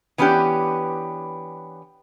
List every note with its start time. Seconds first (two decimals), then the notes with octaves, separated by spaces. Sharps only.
0.18 E3 B3 C#4 D4 G4